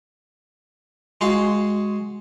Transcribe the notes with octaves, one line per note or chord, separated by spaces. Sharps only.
G#3 F#4 F5 C6